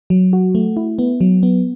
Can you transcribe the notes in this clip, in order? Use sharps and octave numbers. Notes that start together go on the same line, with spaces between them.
F#3
F#4
A3
E4
B3
F#3
B3